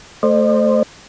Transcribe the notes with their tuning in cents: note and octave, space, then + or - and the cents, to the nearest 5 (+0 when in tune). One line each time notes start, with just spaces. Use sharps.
A3 +0 C5 +0 D#5 -45